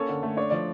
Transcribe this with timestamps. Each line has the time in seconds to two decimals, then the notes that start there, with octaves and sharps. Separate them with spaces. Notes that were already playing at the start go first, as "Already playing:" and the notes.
Already playing: A#3 C#4 A4 C#5
0.09 D3
0.23 A3
0.37 D4 C#5
0.50 F3 D5